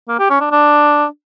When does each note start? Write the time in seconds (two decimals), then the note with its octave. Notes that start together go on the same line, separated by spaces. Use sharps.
0.08 A#3
0.19 G4
0.30 C#4
0.41 D4
0.51 D4